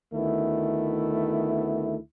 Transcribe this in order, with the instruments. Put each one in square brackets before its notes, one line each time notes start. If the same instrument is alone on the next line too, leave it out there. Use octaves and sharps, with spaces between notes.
[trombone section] D2 D#3 A3 B3 E4